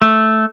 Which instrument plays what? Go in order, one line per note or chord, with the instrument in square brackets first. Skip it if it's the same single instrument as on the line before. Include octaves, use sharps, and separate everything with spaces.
[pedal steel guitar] A3